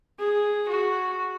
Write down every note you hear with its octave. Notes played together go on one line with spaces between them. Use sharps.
G#4
F#4